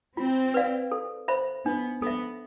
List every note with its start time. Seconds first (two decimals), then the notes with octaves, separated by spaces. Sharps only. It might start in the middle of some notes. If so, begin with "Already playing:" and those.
0.17 C4 F4
0.54 B4 D5 F5
0.92 A4
1.28 C5 E5 B5
1.65 B3 D4
2.02 B3 A4 E5